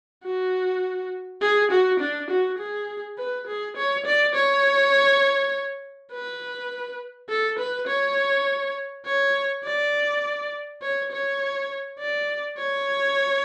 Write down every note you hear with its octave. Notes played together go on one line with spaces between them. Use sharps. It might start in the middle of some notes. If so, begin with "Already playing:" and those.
F#4
G#4
F#4
D4
F#4
G#4
B4
G#4
C#5
D5
C#5
B4
A4
B4
C#5
C#5
D5
C#5
C#5
D5
C#5